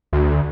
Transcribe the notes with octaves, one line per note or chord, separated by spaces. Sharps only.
D2